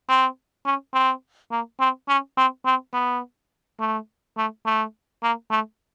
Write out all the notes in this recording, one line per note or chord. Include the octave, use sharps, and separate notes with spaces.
C4
C#4
C4
A#3
C4
C#4
C4
C4
B3
A3
A3
A3
A#3
A3